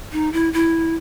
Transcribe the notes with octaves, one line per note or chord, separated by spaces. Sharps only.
D#4
E4
E4